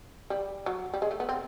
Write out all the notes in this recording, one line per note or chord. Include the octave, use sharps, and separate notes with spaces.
G3
F#3
G3
G#3
A3
B3
C4